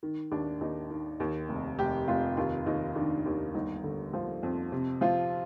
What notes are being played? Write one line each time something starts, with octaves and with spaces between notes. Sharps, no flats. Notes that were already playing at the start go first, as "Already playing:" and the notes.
D#3
D#2 D4
D#2 D#4
D#3
D#2
F1
F1 G4
F1 F4
D#2 F4
D#2 D#4
D#3 D4
D#2
G1 D#4
D3
F3
F2
C3
F3 F4